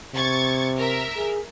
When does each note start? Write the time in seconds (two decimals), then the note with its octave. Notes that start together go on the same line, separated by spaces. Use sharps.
0.15 C3 C#6 G#6 A6
0.76 A#4 E5
1.16 G#4